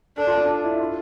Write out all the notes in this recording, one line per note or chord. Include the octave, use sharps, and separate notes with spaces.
D4 A4
F4
D4
E4
F4